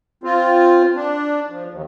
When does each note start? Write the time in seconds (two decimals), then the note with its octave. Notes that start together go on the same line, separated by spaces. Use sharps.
0.24 C4 F4
0.96 D4
1.50 F3
1.71 D#2